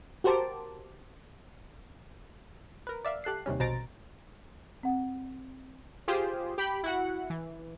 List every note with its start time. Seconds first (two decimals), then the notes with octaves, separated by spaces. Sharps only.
0.24 F#4 G4 A#4 C5 A5 D6
2.87 A#4 B4
3.05 D5 E5 F5
3.24 G4 A4 F#6 C7
3.46 D#2 C3 G3 C#4
3.60 A#1 B2 C5 A#5 A6 D7
4.83 C4 F#5
6.08 F4 G4 G#4 C5
6.58 G4 G5 B5
6.84 E4 F#4 F#5
7.30 E3